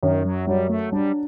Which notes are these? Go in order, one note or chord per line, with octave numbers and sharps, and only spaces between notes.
F#2 D#3
F#3
F#3 G3
A3
G3 D4